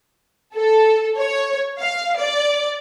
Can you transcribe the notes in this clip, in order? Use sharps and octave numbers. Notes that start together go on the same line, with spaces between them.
A4
C#5
F5
D5